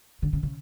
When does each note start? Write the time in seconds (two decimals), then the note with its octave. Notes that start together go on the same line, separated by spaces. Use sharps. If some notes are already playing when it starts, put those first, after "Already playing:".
0.22 D3
0.33 C#3
0.43 C#3